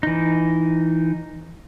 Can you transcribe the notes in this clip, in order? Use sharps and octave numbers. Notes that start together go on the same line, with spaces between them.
E3 D#4